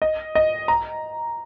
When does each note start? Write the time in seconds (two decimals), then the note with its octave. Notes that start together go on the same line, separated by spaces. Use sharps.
0.02 D#5
0.35 D#5
0.68 A#5